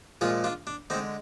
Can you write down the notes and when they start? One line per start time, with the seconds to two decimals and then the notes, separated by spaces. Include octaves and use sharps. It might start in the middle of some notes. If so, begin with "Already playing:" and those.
0.21 A#2 F3 G#3 F4 G#4
0.44 D4 F4
0.67 D4
0.90 D3 C4 D#4
0.94 G#3